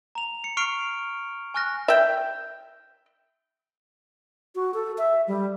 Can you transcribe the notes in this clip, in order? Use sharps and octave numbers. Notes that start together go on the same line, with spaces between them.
A#5 F7
C#7
C#6 F6 C7 D7 F7
G#5 C#6 F6 F#6 A#6
E5 G5
F#4
A4
E5
G3